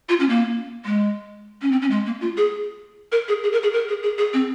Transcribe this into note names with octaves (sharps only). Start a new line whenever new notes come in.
F4
C#4
A#3
G#3
C#4
C4
C#4
G#3
A#3
F4
G#4
A#4
G#4
G#4
A#4
G#4
A#4
G#4
G#4
G#4
C4